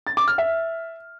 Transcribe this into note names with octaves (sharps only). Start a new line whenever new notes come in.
A6
D6
F6
E5